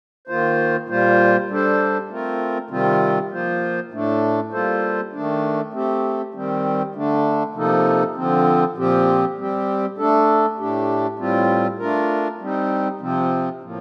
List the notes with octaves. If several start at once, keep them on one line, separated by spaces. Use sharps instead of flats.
D#3 A#3 F4 C5
A#2 G3 A#3 F4 C5
G3 D4 A4 C5
A3 C4 F4 A#4
C3 D#3 G3 C4 F4
F3 A#3 F4 C5
A2 A3 D4
G3 A#3 F4 A4 C5
D#3 A3 D4
A3 C4 G4
D#3 G3 C4
D3 A3 D4
C3 F3 A#3 D#4 A4
D3 F3 C4
A#2 F3 C4 G4
G3 C4 G4
A3 D4 A4
A2 A3 D4 G4
A2 G3 C4 F4
A3 D4 F4 A#4
G3 C4 D#4
C3 F3 C4
A2 F3 A#3